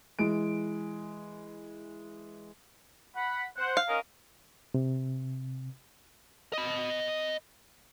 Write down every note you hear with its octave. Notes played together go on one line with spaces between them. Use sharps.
E3 G#3 D7
F#5 B5
C5 F#5
F5
C#4 A#4 D#5
C3
D#5 B5